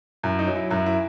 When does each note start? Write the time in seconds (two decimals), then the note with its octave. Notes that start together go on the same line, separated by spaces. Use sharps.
0.23 F#2 E4
0.39 D#4
0.47 F#3
0.56 E4
0.70 F#2 E4
0.86 E4